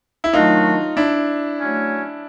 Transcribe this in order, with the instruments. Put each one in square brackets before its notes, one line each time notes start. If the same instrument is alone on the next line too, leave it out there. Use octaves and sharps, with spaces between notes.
[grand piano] E4
[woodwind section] D#3 F#3 A3 D4 F#4 [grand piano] D#4 F4
[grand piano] D4 E4
[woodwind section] F#3 A3 C#4